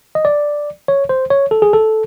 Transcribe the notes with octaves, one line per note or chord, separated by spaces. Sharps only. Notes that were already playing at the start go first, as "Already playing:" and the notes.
D#5
D5
C#5
C5
C#5
A4
G#4
A4